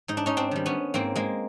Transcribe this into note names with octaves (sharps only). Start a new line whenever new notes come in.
G#2 D#4
D4
C#4 D#4
C4 D4
D#3 G3
B3 C#4
G#2 A#3 C4
G#3 A#3